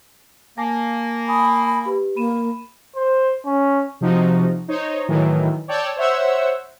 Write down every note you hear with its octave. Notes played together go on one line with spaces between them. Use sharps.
A#3 G#5 A5 A#6
G#5 A5 B5 D#6
G4 B4
A#3 B5 D#7 E7
C5
C#4
C3 F3 D#4 F#4
D#4 C5 C#5
A2 D#3 E3 F#3
C#5 D5 G5 A5 E6
C5 C#5 E5 F#5 E6